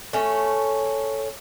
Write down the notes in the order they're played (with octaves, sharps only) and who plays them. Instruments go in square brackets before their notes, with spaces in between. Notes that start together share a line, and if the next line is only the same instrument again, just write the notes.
[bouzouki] A3 C#4